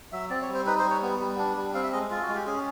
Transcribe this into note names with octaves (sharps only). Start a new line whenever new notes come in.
F#3 E5
C4 D5
C#5
G3
C5
D#4 B4
C5
G3
C#5
B3
G3
D4
G3
C4 F5
E5
G#3 D#5
F4
F#4
G#3
G4
C#4 G#4